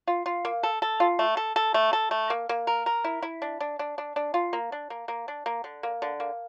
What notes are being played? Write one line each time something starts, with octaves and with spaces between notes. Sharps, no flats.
F4
F4
A#3
A4
A4
F4
A3
A4
A4
A3
A4
A3
A#3
A#3
A#4
A#4
E4
E4
D4
D4
D4
D4
D4
F4
A#3
D4
A#3
A#3
D4
A#3
D3
A#3
D3
A#3